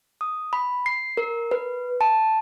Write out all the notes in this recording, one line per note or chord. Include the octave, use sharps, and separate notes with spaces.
D#6
B5
C7
A#4
B4
A5